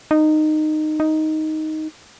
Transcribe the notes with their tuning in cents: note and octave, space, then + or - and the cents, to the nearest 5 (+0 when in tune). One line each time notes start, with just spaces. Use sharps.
D#4 -15
D#4 +5